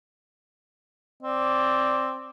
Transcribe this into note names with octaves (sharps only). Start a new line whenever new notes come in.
C4 D5